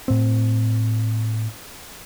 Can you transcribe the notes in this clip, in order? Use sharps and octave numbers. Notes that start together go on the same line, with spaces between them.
A2 C4